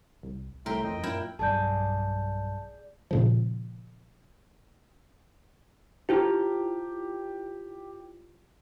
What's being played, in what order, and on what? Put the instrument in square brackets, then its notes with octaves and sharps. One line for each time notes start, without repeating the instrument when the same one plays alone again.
[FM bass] C2
[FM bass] C2 [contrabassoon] A2 [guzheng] A#4 [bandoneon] E5 G5 C6
[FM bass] F2 [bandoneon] D#5 G5
[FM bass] F#2 [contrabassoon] A#2 [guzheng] E4 [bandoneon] A#4 G5
[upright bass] B1 G2 [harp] G#4 D5 [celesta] A5 G6
[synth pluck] A#2 C#3 F3
[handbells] E4 F4 C5 [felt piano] G4